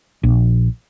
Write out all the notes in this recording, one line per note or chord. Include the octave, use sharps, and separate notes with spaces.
A#1